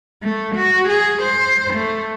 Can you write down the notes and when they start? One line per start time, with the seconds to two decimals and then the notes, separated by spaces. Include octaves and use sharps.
0.23 A3
0.56 F#4
0.89 G#4
1.22 C5
1.74 A3